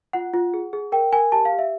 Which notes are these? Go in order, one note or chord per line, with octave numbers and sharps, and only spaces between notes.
F4 F#5
F4
G#4
G#4
A#4 G5
A#4 G#5
G4 A5
F5
G4
E5